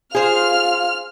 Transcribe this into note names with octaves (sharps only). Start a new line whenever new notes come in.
F4 G#4 C5 F5 F6